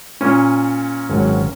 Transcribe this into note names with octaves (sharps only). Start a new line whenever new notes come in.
A#2 C#4
G#1 F#3